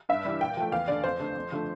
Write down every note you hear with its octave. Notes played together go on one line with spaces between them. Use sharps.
G2 E5
E3 G3
A#2 G5
F3 A3
E2 F5
D3 A3 D5
F2 C5
D3 A3
F2
D3 F3 A3